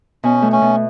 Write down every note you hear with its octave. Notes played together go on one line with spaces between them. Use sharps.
B2 C#4
A3
C#4
B2